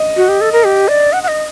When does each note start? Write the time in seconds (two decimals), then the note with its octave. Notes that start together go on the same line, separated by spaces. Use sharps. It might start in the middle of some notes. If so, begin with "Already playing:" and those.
Already playing: D#5
0.17 F#4
0.29 G4
0.41 A4
0.52 A#4
0.64 G4
0.88 D5
1.13 F#5
1.23 F#5
1.28 D#5